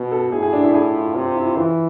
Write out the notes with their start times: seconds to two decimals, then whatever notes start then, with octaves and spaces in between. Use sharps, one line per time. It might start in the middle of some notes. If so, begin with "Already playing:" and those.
Already playing: B2
0.12 A4
0.32 A2 G#4
0.43 G#4
0.53 D4
0.64 E4
0.74 G#4
0.94 F4
1.15 C3 F4
1.36 E4
1.47 F4
1.56 E3 E4